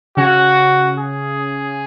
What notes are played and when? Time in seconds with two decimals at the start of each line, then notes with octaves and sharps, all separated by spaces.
0.17 C#3 C#4 F#4
0.98 G#4